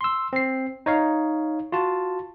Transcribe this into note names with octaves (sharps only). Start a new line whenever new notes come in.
C6 E6
C4 C7
D#4 C#5 F5
F4 F#4 A5